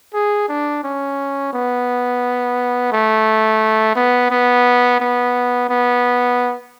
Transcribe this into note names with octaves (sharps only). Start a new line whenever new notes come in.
G#4
D4
C#4
B3
A3
B3
B3
B3
B3